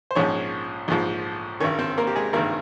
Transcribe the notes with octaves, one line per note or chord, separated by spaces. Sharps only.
C5
A#1 G#2 F3 C#4 C#5
A#1 G#2 F3
G#1 G2 D#3 C#4 C#5
C4 C5
A#3 A#4
G4
G#3 G#4
G#1 G2 D#3 A#3 A#4